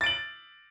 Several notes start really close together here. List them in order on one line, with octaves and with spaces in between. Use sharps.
A6 D7 F#7